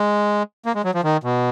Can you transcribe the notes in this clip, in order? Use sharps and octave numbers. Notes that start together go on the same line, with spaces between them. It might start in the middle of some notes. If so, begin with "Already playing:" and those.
Already playing: G#3
A#3
G#3
F#3
F3
D#3
B2